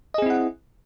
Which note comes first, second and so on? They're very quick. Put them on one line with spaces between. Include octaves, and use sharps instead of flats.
D#5 G#4 C4 E4 F#5